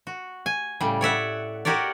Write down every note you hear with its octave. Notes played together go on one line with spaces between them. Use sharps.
F#4
G#5
A2 C#3 G3
C#5 D5 E5 F#5
F#4 G4 A#4 C#5 D5